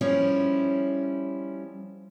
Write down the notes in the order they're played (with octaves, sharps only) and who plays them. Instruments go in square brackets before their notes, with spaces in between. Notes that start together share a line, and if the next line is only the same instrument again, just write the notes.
[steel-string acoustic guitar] F3 G3 C#4 E4